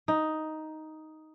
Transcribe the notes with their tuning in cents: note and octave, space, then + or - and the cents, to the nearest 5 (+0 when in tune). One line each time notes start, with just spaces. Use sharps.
D#4 +5